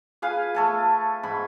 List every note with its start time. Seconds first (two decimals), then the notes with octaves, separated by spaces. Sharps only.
0.22 G#4 B4 F5 G#5
0.55 A3 A4 G#5
1.23 G#2 B5